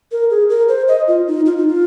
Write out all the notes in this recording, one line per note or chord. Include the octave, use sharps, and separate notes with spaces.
A#4
G#4
A#4
C5
D#5
F4
D#4
F4
D#4
F4